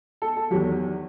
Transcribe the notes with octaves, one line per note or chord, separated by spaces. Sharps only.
A4
A4
E2 D#3 F#3 G4